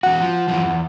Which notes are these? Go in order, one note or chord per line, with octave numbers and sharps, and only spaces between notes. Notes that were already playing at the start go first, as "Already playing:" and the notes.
E2 F#4 F#5
F3
F2 E3 F3
E2